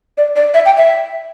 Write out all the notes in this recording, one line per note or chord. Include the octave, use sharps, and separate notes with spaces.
D5
D5
E5
G5
E5